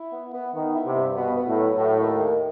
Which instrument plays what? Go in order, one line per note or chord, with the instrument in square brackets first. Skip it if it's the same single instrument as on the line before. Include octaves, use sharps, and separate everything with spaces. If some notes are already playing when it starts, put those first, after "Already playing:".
Already playing: [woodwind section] E4
B3
B3
[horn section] D#3 [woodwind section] B3
[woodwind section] E4
[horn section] C3
[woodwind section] G2
[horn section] B2 [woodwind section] B3
[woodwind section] B3
[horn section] A2
[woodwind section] F#3
[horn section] A2 [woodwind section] A3
[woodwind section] D#2
D#3